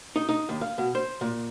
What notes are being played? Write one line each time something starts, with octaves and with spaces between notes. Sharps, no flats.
D#4
D#4
D#2
F5
B2
C5
A#2